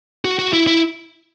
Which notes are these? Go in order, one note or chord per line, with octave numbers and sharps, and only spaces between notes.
F#4
F#4
E4
E4